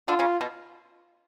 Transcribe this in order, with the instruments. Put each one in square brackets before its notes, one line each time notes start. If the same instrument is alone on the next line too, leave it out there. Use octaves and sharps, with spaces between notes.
[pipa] D3 D4 [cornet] F4
[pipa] C#3 C#4
B2 B3